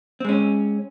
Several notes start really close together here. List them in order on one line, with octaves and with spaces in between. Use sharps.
C4 G#3 C#4